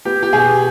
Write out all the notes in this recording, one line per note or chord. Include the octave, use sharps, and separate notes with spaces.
B3 G4
G4
B2 G#4